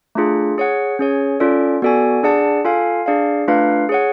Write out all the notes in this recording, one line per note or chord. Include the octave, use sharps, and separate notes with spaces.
A3 D4 F4 G#4
G#4 C#5 F#5
C#4 G#4 C#5
C#4 F4 A4 D5
B3 F#4 A4 D5 G#5
D4 G#4 D5 F#5 A5
F4 A4 F5 G#5
D4 G#4 D5 F5
A3 D4 F4 B4 F5
G#4 C#5 F#5